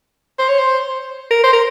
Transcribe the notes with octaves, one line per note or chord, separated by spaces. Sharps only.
C5
C#5
C5
A#4
C5
A#4